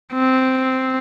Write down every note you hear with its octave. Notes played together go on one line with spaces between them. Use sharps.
C4